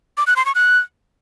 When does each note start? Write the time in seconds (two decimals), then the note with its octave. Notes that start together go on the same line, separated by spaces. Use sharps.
0.17 D6
0.27 F#6
0.36 C6
0.46 C#6
0.55 F#6